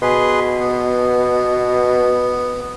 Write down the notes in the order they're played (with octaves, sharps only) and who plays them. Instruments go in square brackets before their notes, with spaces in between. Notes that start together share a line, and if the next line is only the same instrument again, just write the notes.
[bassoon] B2 [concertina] G#4 B4 C6
[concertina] B3